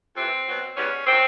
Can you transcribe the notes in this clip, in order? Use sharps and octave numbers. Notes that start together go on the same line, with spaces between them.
F2 C3 E3 C4
B2 F#3
E2 B2 G3 C#4
D#3 F#3 C4